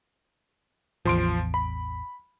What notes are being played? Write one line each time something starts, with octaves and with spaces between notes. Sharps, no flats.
A1 E2 F3 C6 D7
B5